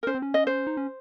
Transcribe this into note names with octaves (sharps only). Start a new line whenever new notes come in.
A#4
C#4 C5
C4
C#4
D#5
C5
D#4
C#4